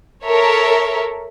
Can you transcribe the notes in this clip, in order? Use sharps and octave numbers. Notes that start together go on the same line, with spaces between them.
A4 A#4 C#5 E5